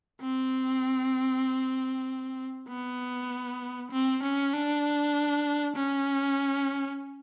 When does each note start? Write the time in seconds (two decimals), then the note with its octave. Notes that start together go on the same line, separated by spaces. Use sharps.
0.22 C4
2.69 B3
3.92 C4
4.24 C#4
4.54 D4
5.77 C#4